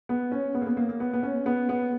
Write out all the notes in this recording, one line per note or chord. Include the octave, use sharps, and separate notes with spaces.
B3
C#4
B3
A#3
B3
A#3
A#3
B3
B3
C#4
B3
B3